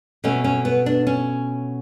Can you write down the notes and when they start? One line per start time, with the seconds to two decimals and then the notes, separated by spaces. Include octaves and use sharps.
0.24 B2 A3 C#4
0.44 C#4
0.65 B3
0.86 D4
1.07 C#4